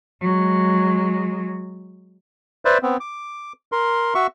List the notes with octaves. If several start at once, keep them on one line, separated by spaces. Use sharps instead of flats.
F#3 G#3
B4 C5 D5 E5
B3 C4
D6
A#4 C6
F#4 E5 C#6